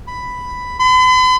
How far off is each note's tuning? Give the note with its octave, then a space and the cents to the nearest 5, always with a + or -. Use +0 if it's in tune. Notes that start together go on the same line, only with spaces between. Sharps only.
B5 +5
B5 +45